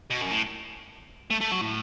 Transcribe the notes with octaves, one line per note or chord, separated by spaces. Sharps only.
B2
F#2
A2
A3
A3
F#3
A2